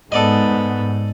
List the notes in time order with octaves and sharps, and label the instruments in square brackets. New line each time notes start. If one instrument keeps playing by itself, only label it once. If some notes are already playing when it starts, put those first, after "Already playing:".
[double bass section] G#2 [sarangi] B3 [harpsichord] A4 D5 D#5